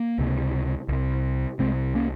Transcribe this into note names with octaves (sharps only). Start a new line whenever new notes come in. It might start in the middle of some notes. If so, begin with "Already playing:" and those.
Already playing: A#3
C#2 C3
C2 C3
C2 C3 G#3 C4
A#3 C#4